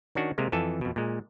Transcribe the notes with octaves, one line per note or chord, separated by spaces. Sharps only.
D#3 C#4 D4 F#4
C3 G#3 A#3
F2 E3 A4 G#5 A5
F2 B2
A#2 G#3